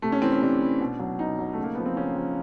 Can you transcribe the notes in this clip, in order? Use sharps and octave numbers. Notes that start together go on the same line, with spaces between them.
C3 A3
C#4
E3 C4
C#4
C3 D4
E3
B2
F#3
B2 D#4
F#3
C#3 A3
A#3
F3 B3
C4
C#3 C#4
F3